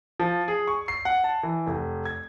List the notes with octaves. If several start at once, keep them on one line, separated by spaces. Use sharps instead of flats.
F3
G#4
C#6
C7
F#5
A5
E3
F1
G#6